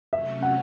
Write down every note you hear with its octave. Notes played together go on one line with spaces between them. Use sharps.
C3 F#3 A3 C#4 E5
F#5